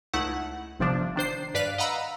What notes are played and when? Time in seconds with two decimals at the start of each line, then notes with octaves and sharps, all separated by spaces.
0.13 C#2 A3 D#4 E4 F#5
0.79 G1 C3 F3 D4
1.16 D#3 D4 C5 C7
1.54 G2 B4 D5 F5 F#6 B6
1.78 D#5 F5 F#5 A#5 B5 E6